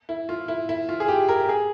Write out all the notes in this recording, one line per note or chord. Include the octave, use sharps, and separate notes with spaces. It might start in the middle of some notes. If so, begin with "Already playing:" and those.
E4
F4
E4
E4
F4
G#4
G4
A#4
G#4